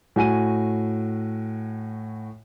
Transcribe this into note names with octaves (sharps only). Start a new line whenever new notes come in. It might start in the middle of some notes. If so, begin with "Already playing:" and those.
A2 F#4 G#5 D#7